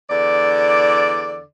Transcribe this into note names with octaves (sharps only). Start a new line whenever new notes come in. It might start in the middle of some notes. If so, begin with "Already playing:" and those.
E2 D3 D5